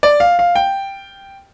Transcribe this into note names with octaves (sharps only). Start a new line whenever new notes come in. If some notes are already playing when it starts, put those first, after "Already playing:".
D5
F5
F5
G5